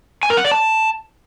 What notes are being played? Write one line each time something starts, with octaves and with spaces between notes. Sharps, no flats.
G#5
A#4
F#5
D5
A5